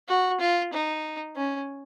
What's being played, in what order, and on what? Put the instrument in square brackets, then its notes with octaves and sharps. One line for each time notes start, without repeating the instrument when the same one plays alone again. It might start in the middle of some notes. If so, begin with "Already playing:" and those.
[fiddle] F#4
F4
D#4
C#4